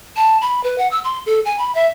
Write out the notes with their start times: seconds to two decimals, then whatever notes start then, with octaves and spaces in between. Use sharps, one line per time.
0.16 A5
0.42 B5
0.64 B4
0.78 F#5
0.91 E6
1.04 C6
1.26 A4
1.45 G#5
1.59 B5
1.75 E5